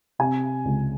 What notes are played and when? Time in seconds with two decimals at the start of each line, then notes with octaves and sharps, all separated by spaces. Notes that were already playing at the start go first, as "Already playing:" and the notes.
0.19 C3 G#5
0.65 C#2